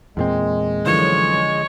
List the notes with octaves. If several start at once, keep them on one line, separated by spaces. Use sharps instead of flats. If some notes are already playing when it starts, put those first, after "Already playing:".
E2 A#2 G#3 C4
F#2 A2 D3 E3 F3 C#5